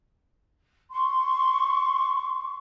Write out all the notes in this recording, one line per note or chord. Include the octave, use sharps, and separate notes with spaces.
C6 C#6